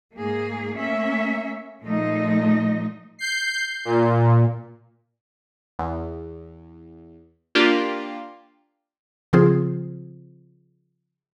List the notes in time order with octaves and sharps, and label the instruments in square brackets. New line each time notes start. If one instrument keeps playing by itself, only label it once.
[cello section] G#2 A#3 G#4
A3 A#3 C#4 E5
A#2 F3 G#3 A3 D#4 D#5
[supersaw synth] G6 C7
A#2
[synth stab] E2
A#3 D4 F4 G4
[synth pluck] C#3 F3 C4 F4 G#4 C5